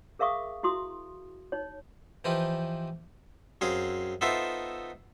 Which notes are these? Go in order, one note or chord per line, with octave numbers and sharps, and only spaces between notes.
G#4 A#4 E5 F5 C#6 D#6
E4 F#4 C6 D#6
D#4 C#5
E3 F3 D#4 F4 G4 B4
F#2 C4 G#4 F5
B3 D#4 F4 A4 C5 E5